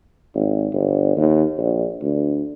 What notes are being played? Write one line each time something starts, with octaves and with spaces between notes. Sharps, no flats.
G#1
G1
D#2
A#1
D2